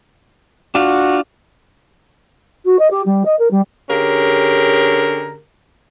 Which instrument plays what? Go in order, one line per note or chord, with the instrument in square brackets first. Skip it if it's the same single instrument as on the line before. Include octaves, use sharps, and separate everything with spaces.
[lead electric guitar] D4 F4 [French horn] F#4
[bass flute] F#4
D#5
G4
G3
D#5
A#4
G3
[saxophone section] D3 C#4 G4 G#4 A#4